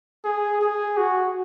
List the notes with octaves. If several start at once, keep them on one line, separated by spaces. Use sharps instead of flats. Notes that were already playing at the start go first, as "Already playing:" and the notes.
G#4
G#4
F#4